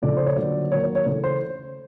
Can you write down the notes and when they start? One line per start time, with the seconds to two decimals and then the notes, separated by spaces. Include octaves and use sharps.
0.02 C#3 F3 A3 D5
0.17 C5
0.26 C#5
0.36 D3 F#3 A#3 D5
0.72 D#3 F#3 A#3 C#5
0.83 C#5
0.95 C#5
1.06 C#3 E3 A3 C#5
1.24 C5